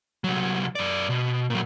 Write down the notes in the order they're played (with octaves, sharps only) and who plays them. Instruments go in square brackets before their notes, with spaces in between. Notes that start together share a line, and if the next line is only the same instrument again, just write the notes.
[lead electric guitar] C2 F#3
F#2 D5
B2
A#2 F#3